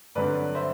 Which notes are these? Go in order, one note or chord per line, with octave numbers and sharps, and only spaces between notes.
G2 D3 F#3 C4 B4 D5
C5 E5